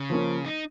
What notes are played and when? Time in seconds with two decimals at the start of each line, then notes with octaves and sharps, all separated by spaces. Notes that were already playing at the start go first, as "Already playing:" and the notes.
Already playing: C#3
0.10 F3 A#3 C#4
0.46 D#4